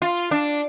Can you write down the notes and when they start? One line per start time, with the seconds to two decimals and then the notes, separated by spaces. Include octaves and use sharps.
0.02 F4
0.31 D4